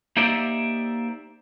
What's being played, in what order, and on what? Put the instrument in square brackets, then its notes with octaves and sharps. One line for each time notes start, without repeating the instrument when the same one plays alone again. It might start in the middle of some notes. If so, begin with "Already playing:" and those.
[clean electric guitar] A#3 D#4 G4 C5 D5 E5